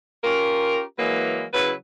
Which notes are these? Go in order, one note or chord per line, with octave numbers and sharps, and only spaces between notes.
C#4 F4 G4 A#4
E3 F#3 G#3 A#3 B4
C#3 F#3 E4 B4